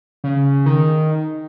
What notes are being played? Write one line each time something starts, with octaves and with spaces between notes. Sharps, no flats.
C#3
D#3